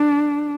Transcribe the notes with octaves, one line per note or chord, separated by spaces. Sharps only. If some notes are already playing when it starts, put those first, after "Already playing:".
Already playing: D4